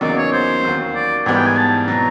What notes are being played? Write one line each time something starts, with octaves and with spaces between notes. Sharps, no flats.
E2 C#3 F#3 A#3 D#4 D5
C#5
C5
D#2 D#3 F#3
D5
G#2 E3 G3 B3 G#5
G5
G#5
A5
B2 F#3 A#5